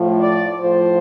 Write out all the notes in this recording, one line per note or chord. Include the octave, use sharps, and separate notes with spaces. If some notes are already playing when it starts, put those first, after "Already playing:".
Already playing: A2 F3
D5
A2 F3 C5